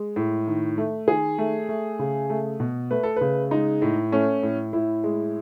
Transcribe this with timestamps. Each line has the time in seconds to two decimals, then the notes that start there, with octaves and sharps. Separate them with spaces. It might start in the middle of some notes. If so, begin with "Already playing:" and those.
Already playing: G#3
0.16 A2
0.47 D#3
0.78 A3
1.08 D#3 G#4
1.38 A3
1.69 A3
1.99 C#3
2.30 A3
2.60 B2
2.91 A3 B4
3.03 A4
3.16 C#3 B4
3.51 G#3 D#4
3.82 A2
4.12 A3 C#4
4.43 A2
4.73 A2 E4
5.04 G#3